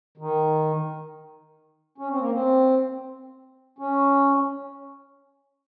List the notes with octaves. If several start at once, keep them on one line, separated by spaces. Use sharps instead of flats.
D#3
C#4
C4
A#3
C4
C#4